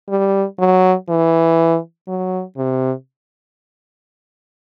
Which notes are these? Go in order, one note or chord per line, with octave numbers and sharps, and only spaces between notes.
G3
F#3
E3
F#3
C3